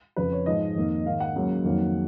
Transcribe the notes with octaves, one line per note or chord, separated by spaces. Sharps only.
F2 C#3 F3 B4
C#5
G#2 F3 G#3 D#5
F2 D#3 A#3
G#2 D#3 A#3 F5
F#5
C#2 C#3 F#3 A#3
F2 D#3 F#3 A#3